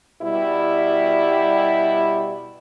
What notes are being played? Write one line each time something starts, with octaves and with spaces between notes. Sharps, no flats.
B2 G3 E4